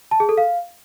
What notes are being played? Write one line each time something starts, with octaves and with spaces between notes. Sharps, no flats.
A5
G#4
A4
F5